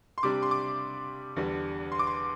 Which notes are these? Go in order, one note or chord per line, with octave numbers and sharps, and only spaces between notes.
C6
C3 G3 D4 D6
C6
D6
E2 D3 G3
C6
D6
C6